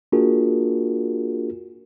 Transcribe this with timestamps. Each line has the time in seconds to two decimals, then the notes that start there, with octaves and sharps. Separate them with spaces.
0.12 A#3 D4 F4 F#4 G#4 A#4